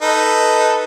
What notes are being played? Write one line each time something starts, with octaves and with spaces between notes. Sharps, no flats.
D#4 A4 B4